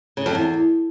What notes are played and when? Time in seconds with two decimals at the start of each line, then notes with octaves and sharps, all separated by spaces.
0.17 C#3
0.26 F2
0.35 E2